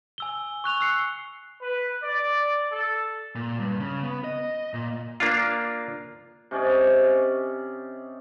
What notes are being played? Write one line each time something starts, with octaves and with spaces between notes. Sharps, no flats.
G#5 E6 G7
C#6 F#6 F7 G7
E6 C7 C#7
B4
D5
A4
A#2
G2
C#3
B3
D#5
A#2
A#3 D4 F4
C3 C#4 D5 D#5